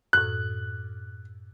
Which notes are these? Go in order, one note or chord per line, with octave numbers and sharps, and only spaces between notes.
F#2 A2 F#6